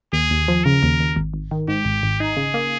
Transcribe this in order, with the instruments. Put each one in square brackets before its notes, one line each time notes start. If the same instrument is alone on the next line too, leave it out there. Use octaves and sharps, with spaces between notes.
[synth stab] D#2 [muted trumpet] G#4
[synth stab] D#2
F3
[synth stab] C#3 [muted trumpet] A#4
[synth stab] D#2
D#2
G#1
G#1
D#3
[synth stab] G#2 [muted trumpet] G4
[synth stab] G#1
G#1
[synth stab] D#4 [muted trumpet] G#4
[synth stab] C#3
A#3